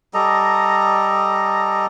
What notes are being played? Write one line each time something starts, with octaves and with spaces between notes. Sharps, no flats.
G3 A4 D#5 A#5